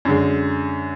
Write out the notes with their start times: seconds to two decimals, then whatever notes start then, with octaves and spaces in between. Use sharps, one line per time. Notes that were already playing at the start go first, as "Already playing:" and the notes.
0.05 F#2 D3 G#3